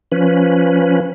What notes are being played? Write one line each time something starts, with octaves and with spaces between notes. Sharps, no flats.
F3 C#4 B4